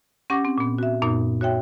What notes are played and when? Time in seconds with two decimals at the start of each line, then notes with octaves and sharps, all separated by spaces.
0.30 C#4 G4 F#5 C#6 D6 A#6
0.45 C4
0.58 A#2 B3
0.78 F#4 E5
1.02 F#2 A#2 B3 D#4
1.41 F#4 C#5 E5 G5